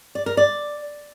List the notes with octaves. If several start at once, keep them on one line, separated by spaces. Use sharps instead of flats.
D5
A#4
D5